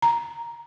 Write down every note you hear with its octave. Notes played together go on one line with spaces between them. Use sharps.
A#5